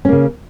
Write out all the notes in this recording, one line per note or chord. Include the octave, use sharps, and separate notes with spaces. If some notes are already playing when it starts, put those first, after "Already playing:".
C#3 A#3 C#4